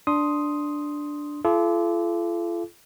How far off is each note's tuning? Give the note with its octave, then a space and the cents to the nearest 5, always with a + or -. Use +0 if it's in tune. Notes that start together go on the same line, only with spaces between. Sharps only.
D4 +0 C6 +0 D#6 +5
F4 -40 A4 -35 D6 +0